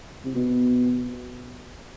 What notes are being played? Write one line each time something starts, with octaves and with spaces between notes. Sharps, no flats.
C3
B2